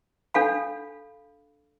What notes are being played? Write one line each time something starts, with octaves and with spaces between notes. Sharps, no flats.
D4 A4 F5 B5